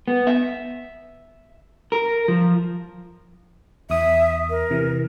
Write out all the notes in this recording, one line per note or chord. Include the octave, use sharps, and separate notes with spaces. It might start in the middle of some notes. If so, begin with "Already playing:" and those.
B3
E5
A#4
F3
E2 E5 D#6
A#4
C3 E3